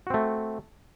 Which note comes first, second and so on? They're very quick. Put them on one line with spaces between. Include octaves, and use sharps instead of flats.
F#4 C4 A3